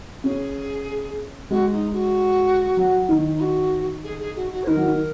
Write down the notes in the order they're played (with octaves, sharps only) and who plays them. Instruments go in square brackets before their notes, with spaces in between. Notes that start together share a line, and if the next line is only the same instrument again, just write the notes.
[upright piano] C#4 [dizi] G#4
[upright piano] G#3 [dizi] F#4
[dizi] D#4
F#4
[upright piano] F#3
D#3
[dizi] D#4
F#4
G#4
G#4
F#4
F#4
C#5
[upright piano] D#3 [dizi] A#4
[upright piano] F#3
D#3